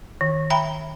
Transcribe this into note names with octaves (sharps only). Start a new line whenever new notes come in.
D#3
E5 G5 A#5 B5